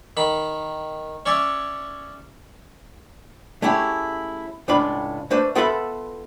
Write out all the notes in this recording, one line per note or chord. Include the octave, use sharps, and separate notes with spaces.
D#3 B5
C#4 C#5 D5 E5
A3 C#4 E4 G4 G#4
C#2 A2 D4 F4 B5
A3 D4 B4 C5
B3 F4 A4 B4 E5 B5